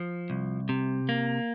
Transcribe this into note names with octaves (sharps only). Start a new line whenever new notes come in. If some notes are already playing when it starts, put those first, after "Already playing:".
Already playing: F3
C2
C3
A#3